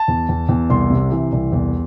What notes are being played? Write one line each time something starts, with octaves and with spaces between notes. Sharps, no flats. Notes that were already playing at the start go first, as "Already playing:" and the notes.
Already playing: A5
E2
E2
E2
C2 C6
C3
E3
C2
E2